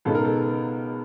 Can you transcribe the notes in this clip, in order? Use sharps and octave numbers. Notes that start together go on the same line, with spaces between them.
C#2 B2 G#3 B3 D#4 A4
A#4
A4